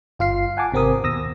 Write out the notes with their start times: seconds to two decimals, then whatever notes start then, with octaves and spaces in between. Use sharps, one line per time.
0.19 G1 F4 F5 C7
0.57 F#5 G#5 A5 D6
0.72 G#1 C3 C4 A#4 D#6
1.03 D#2 B2 D#6 E6 A#6